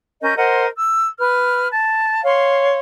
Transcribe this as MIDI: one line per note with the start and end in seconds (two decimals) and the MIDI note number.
0.21 0.33 61
0.21 0.33 70
0.21 0.33 75
0.21 0.33 91
0.35 0.66 70
0.35 0.66 72
0.35 0.66 75
0.35 0.66 78
0.76 1.07 88
1.19 1.68 71
1.19 1.68 89
1.71 2.22 81
2.23 2.79 73
2.23 2.79 77
2.23 2.79 84